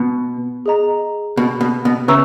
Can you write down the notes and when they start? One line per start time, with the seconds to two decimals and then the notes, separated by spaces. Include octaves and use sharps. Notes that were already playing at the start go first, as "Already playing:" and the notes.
Already playing: B2
0.66 G#4 D#5 A#5
1.37 B2
1.61 B2
1.85 B2
2.08 C#3 B4 E5 A#5 C#6 E6